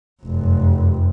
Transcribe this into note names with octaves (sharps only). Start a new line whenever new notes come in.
F1 F#2